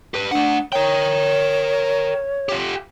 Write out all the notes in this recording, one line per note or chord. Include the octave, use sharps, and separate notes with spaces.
G4 B4
A3 D4 F#5
A#4 C#5 G5
F4 G4